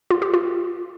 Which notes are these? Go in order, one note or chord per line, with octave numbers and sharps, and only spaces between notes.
F4
G4
F4